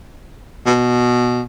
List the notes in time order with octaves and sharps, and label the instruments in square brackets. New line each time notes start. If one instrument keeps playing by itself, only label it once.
[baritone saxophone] B2